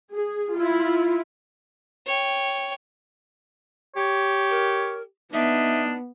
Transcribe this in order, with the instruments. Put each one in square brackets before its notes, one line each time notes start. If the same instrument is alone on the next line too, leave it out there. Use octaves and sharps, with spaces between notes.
[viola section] G#4
E4 F4
[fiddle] C#5 G5
[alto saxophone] G4 [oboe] C#5
[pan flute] A#4
[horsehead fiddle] B3 [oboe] D4 [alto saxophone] D#4 [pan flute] E5